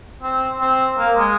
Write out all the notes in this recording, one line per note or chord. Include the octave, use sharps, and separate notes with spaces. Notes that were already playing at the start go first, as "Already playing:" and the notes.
C4
C4
A#3
G#3